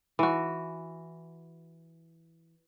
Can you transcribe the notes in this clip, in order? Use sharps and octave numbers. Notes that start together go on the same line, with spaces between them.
E3 F#4